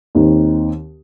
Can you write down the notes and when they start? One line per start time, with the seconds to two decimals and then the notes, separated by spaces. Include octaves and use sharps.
0.15 D#2 D#3 C4 D#4